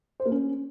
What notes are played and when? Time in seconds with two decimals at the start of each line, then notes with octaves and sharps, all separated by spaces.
0.20 C5
0.26 A#3
0.31 C#4